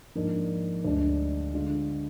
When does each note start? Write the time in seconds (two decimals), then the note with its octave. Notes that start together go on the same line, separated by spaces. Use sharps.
0.15 G#2 F3 A#3 D4
0.84 D2 D3 G#3 D4
1.54 D3 G#3 D4 F4